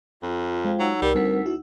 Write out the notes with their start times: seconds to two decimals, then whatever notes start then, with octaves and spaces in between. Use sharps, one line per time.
0.22 F2 F4
0.65 G#3 C5 F5 G5
0.79 F#3 D#4 F#5 E6
1.02 C2 G3 A#4
1.15 D2 G3 C4 B6
1.46 E4 F#4